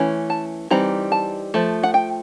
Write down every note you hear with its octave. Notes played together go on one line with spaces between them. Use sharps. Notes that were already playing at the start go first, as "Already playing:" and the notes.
Already playing: E3 A3 C#4
A5
E3 G3 C4 D#4 A#5
A5
F3 A3
F#5
G5